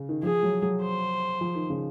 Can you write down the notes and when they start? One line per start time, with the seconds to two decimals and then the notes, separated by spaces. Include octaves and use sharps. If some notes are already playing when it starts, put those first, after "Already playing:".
Already playing: C#3
0.09 D#3
0.23 F3 G#4
0.43 F#3
0.62 F#3
0.82 C5
1.41 F3
1.55 D#3
1.70 C#3